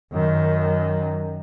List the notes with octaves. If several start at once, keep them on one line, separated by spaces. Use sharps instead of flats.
F#2 D#3